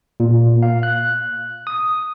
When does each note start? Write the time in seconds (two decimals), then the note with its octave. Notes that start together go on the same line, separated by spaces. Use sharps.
0.20 A#2
0.63 F5
0.83 F#6
1.67 D#6